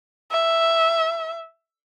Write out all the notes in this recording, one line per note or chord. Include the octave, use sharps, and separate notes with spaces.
E5